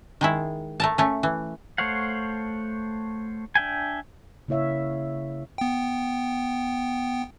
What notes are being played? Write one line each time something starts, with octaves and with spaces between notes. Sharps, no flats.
D#3 G#3 E4
A3 A#4 A5
A3 C#4
E3
A3 C5 C#5 F5 F#5
D4 E5 G5 G#5
C#3 A#3 E4 C#5 E5 F5
B3 G5